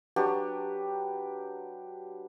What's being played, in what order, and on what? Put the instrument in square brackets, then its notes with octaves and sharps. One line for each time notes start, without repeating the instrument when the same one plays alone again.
[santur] F#3 D4 G4 B4